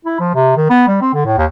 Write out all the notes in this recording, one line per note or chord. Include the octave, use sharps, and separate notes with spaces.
E4
F3
C3
D#3
B3
G3
C4
D3
A2
D#2